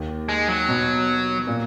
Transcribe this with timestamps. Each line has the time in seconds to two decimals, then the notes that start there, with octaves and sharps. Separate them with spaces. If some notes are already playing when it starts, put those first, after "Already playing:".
Already playing: D#2 D#3
0.29 G#3
0.48 F#3
0.69 B2
1.47 A#2